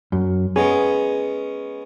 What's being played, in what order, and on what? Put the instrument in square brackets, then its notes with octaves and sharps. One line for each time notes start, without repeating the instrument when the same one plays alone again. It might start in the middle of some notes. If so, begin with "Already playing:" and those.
[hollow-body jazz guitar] F#2
[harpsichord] G#3 B3 C#4 [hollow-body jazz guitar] G#4